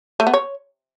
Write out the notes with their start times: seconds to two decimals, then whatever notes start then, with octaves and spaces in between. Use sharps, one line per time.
0.20 A3
0.27 B3
0.33 C#5